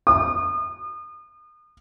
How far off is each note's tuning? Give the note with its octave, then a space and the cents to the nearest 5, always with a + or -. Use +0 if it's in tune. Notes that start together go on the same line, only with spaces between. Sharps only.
D#6 -40